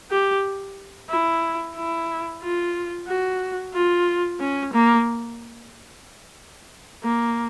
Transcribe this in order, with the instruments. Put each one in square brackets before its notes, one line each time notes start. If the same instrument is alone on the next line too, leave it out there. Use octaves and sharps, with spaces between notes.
[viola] G4
E4
E4
F4
F#4
F4
C#4
A#3
A#3